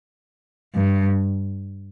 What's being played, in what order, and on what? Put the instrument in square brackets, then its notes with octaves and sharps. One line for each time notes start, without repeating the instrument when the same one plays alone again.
[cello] G2